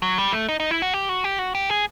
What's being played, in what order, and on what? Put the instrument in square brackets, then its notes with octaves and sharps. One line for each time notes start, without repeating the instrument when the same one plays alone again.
[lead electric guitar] F#3
G3
A3
D#4
D#4
E4
F#4
G4
F#4
G4
F#4
G4
G#4